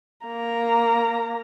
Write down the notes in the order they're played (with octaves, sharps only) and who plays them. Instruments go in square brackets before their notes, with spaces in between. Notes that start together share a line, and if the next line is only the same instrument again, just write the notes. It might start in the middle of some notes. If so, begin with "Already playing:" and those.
[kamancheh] A#3 A#5